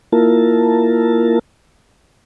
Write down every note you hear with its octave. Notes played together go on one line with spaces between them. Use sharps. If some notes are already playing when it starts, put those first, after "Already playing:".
A#3 E4 F4 A#4 A5